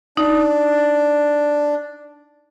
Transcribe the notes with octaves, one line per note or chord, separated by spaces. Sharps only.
D4 D#4